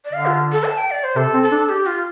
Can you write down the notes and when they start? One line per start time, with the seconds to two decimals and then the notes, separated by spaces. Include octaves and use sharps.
0.05 D5
0.13 D3 F5
0.26 F4
0.52 A4
0.65 A5
0.78 G5
0.91 D5
1.04 C5
1.16 C3 A4
1.34 C4
1.43 A4
1.52 D4
1.69 G4
1.86 F4